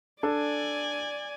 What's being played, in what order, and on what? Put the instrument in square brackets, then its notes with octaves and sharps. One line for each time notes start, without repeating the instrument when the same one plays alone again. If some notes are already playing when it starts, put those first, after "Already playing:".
[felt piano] D4 A4 [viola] D5 G#5